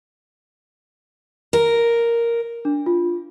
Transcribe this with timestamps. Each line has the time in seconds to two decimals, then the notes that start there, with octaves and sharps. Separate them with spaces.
1.53 A#4
2.65 D4
2.86 F4